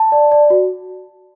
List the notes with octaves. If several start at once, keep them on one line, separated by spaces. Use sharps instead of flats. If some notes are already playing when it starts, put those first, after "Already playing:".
Already playing: A5
D5
D5
F#4